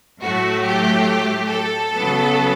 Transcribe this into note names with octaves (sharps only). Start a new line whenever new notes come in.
A2 F#3 A3 F#4
G4
A4
C#3 F#3 B3